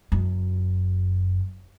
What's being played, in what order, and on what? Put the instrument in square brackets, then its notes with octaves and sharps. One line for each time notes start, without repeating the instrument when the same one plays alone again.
[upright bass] F#1 F#2